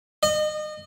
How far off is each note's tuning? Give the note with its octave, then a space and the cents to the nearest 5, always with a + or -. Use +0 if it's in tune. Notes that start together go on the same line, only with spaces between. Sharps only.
D#5 -30